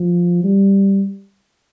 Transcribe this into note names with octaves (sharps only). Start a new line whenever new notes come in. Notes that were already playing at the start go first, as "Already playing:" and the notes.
Already playing: F3
G3